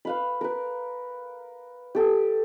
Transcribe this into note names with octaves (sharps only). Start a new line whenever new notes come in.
B4 F5 B5
A#4 B4
G4 A4